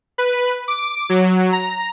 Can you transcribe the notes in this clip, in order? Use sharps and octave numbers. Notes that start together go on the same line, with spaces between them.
B4
D6
F#3
A#5